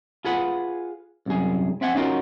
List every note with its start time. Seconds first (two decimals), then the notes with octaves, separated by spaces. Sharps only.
0.25 F4 G#4 B4 F#5
1.26 C2 F#2 G#4
1.81 C4 E5 F#5 G#5
1.95 C#4 D#4 F4 F#4 A#4